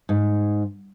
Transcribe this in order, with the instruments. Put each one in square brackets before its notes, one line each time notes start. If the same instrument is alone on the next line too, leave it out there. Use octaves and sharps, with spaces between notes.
[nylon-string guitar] G#2